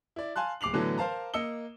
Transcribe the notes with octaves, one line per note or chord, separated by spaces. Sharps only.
E4 D5
F5 G#5 A5 C6 F#6
D1 D6 C7 F7 F#7
A2 D3 E3 F#3 B3 A5
A#4 C5 F5 A5 A#5
A#3 D#5 E6 C#7 G7